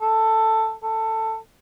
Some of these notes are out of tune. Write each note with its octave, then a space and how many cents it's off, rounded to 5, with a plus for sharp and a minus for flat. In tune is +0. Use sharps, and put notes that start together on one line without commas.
A4 +10
A4 +15